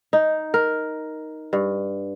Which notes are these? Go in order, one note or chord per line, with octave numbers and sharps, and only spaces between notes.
D#4
A#4
G2